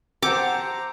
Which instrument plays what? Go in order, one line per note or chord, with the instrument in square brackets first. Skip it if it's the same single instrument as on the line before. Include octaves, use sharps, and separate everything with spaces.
[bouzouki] G4 F#5 A5 [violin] C5 A#5 [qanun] D6 [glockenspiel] E6 G6